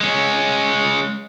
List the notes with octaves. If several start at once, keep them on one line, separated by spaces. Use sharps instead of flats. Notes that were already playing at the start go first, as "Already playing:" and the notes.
G#3 C#4